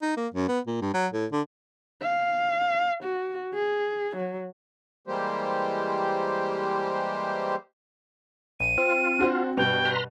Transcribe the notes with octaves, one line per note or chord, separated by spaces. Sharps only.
D#4
A#3
F#2
B3
A#2
G2
F#3
A2
D3
F5
F#4
G#4
F#3
E3 G3 G#3 A#3 G4 C5
A#1 D#7
C4 F4
D4 F#4 C5
G2 B2 G5 F7
B4 A#5 C6